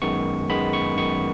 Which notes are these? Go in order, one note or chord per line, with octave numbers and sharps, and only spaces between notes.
F#2 D#3 G#3 B3 C#6
F#2 D#3 G#3 B3 B5
C#6
F#2 D#3 G#3 B3 C#6